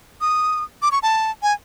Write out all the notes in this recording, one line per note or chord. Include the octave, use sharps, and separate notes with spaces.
D#6
D6
C#6
A5
G#5